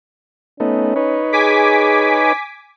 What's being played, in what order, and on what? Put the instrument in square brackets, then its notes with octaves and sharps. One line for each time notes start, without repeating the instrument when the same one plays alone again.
[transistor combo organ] A3 B3 D#4 [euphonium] C#4
[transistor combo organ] D#4 B4 C#5
[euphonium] G#4 [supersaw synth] G#5 D6 B6